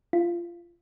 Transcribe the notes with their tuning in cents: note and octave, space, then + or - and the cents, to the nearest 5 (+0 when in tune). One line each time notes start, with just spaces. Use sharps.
F4 -20